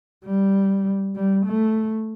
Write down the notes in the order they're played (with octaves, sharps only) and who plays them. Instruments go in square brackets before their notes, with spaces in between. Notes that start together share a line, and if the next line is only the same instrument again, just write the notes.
[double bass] G3
G3
A3